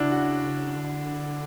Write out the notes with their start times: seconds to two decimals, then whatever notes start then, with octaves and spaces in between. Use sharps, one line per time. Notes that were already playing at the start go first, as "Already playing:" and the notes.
Already playing: C#3 D4 E4 F#4
0.11 F#4
0.76 D3